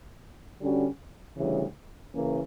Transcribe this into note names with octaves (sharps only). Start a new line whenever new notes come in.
D3 G3 C#4 F#4
D2 C#3 E3 G3
C#3 E3 A#3 C#4